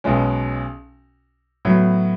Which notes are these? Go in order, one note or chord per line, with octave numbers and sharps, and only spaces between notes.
B1 B2 G#3 C#4
A2 F#3 B3